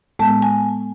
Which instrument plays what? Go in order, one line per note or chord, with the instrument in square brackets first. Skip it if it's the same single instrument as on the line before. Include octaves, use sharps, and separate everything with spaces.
[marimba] A2 G#3 B3 A5
G#5